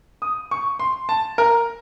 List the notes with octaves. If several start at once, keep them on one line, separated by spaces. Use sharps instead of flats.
D#6
C#6
C6
A5
A#4